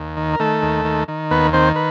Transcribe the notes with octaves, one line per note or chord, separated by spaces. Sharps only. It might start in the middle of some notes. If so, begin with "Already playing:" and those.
Already playing: D#2
D#3
A#4
D#3 A3 A4
D#2
D#3
D#3
D#2 B3 B4
D#3 C4 C5
B4